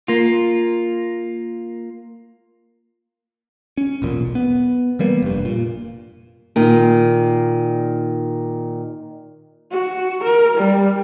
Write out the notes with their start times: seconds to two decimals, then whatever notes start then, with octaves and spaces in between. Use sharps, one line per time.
0.08 A#3 F4
3.78 C#4
4.02 E1 B1 A#2
4.35 B3
4.99 E3 G3 A#3 B3
5.22 F1 G2
5.45 A#2
6.56 A#2 D#3
9.72 F#4
10.24 A#4
10.58 G3